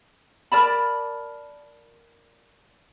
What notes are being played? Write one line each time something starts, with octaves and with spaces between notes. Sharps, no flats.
A#4 D5 A5 B5